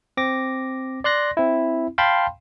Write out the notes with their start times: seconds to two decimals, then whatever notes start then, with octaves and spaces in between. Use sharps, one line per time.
0.17 C4 D6 A#6
1.04 D5 C6 F#6 A#6
1.37 C4 E4
1.98 F5 G5 A5 B5 C6